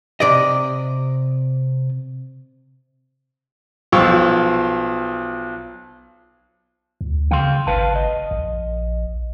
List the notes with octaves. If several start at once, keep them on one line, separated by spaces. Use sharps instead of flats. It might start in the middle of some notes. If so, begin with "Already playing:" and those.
C3 D5 D#5
B1 F3 F5 G5 C#6 E6
D2
C#3 F5 G5 C6
G#1 B4 F5 A5
D#5
A#1